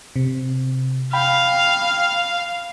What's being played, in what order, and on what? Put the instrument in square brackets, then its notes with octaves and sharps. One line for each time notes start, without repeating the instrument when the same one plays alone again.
[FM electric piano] C3
[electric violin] F5 [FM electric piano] G5 B5